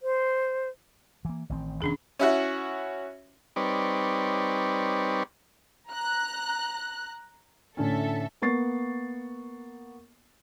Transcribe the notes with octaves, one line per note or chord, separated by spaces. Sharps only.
C5
E3 A#3
A1 D#3 C4
E1 D#3 B3 C#4 D4 G#4
C#4 E4 F#4
G3 C4 D#4 B4 C#5 D5
A#5 F#6
A2 D3 C#4 A4 E5
A#3 B3 C#6 A6 C7